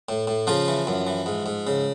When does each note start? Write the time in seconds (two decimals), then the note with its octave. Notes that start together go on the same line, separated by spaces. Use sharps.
0.09 A2
0.27 A2
0.47 C#3 F3 F4
0.68 E3
0.87 F#2
1.07 E3
1.26 G#2
1.46 G#2
1.67 C#3